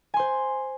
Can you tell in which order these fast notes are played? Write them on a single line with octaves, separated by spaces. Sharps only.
G#5 C6 C5